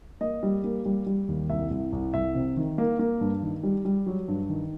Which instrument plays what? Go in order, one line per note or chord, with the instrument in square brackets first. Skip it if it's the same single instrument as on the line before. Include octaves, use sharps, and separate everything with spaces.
[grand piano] A#3 D#5
G3
A#3
G3
G3
D#2
C2 E5
C2
C2
C2 E5
C3
D#3
A#3
A#3
G2
D#3
G3
G3
F#3
G2
D#3